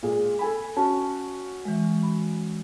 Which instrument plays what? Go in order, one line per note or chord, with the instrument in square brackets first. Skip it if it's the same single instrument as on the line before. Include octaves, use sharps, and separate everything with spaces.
[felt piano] A#2 G#3
A4 G#5 B5
[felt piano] C#4 F#4 [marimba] A5
[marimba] E3 G#3
B5